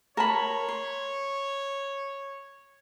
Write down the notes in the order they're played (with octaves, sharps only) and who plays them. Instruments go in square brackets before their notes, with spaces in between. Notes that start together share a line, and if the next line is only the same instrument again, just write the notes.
[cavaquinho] A#4 A5 B5 [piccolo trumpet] C#5
[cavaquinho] C6